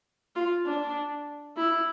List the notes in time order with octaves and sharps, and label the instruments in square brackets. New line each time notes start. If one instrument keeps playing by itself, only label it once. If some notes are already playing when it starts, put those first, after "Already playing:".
[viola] F4
D4
E4